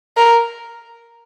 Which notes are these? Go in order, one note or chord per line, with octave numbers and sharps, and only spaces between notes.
A#4